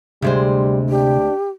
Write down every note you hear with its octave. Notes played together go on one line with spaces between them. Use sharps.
D2 C3 G3 G#3 C4
D4 G4